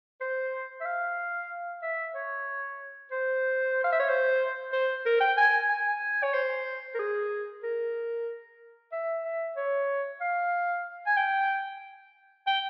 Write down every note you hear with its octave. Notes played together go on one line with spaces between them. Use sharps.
C5
E5
F5
E5
C#5
C5
F5
E5
C#5
C5
C5
A#4
G5
G#5
G#5
G#5
C#5
C5
A#4
G#4
A#4
E5
E5
C#5
F5
G#5
G5
G5